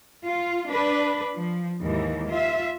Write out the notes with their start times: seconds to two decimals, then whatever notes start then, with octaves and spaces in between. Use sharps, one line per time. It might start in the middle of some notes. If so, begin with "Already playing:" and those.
0.24 F4
0.70 D4 B4
1.34 F3
1.81 D#2 G#2 E3
2.30 F4 E5